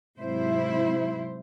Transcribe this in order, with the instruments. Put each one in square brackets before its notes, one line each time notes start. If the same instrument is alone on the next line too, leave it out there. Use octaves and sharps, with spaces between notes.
[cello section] G#2 C3 F#3 E4 C5